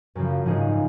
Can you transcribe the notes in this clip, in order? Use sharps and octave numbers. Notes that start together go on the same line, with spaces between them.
F#2 C#3 F3
G#2 F3 G#3 D#4 G#4